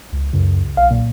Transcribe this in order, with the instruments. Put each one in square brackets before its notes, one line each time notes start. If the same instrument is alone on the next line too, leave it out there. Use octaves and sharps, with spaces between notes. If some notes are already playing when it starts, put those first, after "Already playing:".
[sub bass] C#2
[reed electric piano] C#2 [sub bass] F#2
[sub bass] B1 [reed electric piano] F5
[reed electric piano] A#2